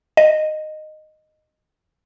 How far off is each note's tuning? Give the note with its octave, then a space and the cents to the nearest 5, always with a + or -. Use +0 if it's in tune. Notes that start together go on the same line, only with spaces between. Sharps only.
D#5 -10